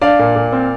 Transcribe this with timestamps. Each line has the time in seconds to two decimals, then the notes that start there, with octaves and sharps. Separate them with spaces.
0.02 D4 D5 F5
0.19 A#2
0.36 A#2
0.53 C4